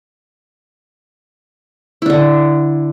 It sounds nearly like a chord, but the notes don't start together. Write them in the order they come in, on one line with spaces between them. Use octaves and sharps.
E4 D4 D3